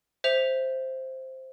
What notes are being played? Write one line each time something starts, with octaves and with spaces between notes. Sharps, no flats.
C5 E5 F7